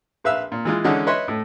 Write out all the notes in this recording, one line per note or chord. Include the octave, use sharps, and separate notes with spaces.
A#1 B4 E5 F5 E6
A#2
E3 G#3 F4
D3 E3 G#3 C#4 D#4
B4 C#5 D#5 E5 C6
A2 A3